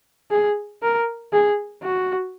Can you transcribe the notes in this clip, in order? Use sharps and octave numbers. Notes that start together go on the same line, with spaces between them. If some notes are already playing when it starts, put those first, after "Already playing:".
G#4
A#4
G#4
F#4